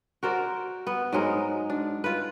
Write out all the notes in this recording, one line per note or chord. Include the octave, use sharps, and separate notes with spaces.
F#4 A#4 C5 D5
B3
G#2 F#3 G#3 A#4
D4
F4 B4